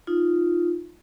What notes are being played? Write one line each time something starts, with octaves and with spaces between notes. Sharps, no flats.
D#4 F4